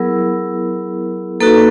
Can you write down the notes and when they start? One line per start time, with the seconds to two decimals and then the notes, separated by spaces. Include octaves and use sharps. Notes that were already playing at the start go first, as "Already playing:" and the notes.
Already playing: F#3 B3 E4 G#4 A#4
1.40 A#3 D#4 F#4 A4 B4